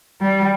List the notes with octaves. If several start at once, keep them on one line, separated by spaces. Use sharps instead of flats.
G3